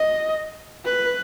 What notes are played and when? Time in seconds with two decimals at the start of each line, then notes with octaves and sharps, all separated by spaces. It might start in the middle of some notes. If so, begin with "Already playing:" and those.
Already playing: D#5
0.85 B4